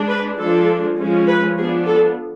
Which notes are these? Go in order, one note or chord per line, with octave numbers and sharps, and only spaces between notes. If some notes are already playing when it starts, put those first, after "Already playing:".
Already playing: G#3 D4
B4
F3 G#3 D4 A4
F3 G#3 C#4
B4
F3 B3 D4 G#4
A4